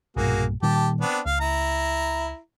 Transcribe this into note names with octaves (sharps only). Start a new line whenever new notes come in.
B1 G2 A#2 A#3 F#4 G#4
A#2 D#3 G3 G4 A5
B3 C4 D4
C#2 F5
E4 A#5